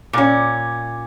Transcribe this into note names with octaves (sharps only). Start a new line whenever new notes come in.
A#2 C#4